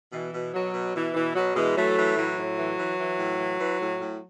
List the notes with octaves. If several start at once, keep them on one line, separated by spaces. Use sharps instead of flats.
B2 E3
B2
B2 F#3
B2
B2 E3
B2 E3
B2 F#3
B2 E3 G#3
E3 F#3 A3
E3
A2 F#3
A2
E3
E3
E3
A2
E3
E3
A2
A2